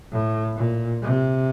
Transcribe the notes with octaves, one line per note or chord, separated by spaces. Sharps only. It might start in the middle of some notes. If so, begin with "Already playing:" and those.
A2
A#2
C3